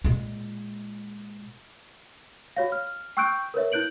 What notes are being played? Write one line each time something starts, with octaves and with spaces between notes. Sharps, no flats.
A#2 G#3
F#4 C#5 F5
F6
G5 C#6 E6 F#6 G6 D7
A#4 B4 C#5 E5
E4 F#6 G6 D7 F#7